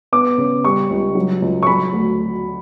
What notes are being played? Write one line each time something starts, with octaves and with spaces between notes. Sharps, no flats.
B3 D6
C#3
G3 C#6
C#2
F#3
C#2
C#6
F#3 B5
D2